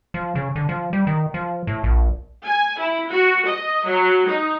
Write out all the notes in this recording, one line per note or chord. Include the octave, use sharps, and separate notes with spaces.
F3
C#3
D3
F3
G3
D#3
F3
A2
A#1
G#5
E4
F#4
D#5
F#3
D#4